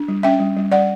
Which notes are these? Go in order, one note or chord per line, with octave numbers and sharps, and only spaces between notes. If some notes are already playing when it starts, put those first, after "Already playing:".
Already playing: D4
G3
C#4 E5 G5
G3
G3
G3 D5 F#5